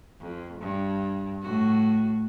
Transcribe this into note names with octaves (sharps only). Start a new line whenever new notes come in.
F2
G2
A2 F#4